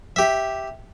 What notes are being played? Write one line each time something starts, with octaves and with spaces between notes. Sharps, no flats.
G4 E5